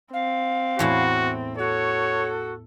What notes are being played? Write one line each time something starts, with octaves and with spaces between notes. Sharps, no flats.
C4 F5
E2 A2 E4 F#4
F#4 A4 C#5